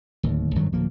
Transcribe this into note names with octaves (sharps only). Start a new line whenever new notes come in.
D1 D#2
G#1 G2 D#3 F#3
D1 F3 A#3